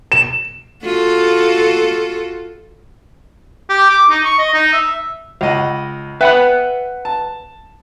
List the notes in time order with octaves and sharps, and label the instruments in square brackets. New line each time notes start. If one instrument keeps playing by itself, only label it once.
[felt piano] E7
[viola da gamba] F4 F#4 A4
[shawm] G4
D6
D#4
C#6
D#5
D#4
E5
[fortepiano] C#2 D#5 F#5
[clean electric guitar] B4 F#5 B5 [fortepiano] E5 G5
[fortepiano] A5